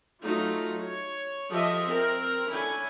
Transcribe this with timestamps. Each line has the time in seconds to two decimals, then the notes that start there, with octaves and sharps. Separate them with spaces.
0.23 F#3 A3 D#4 F4
0.81 C#5
1.51 F3 G4 A4 D#5 E5
1.85 C4 A#4
2.51 D3 C#4 E4 G#5